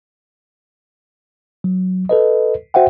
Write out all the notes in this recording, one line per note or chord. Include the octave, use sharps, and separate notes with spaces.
F#3
A4 B4 D#5
F#4 C5 E5 F#5 G5